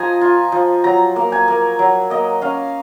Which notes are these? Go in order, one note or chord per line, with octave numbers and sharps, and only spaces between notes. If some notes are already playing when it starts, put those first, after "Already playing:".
Already playing: F3 D#5 G#5 A#5
F4
F3
F#3 A#5
A#3
G#5
A#3
F#3
A#3 D#5
C#4 F5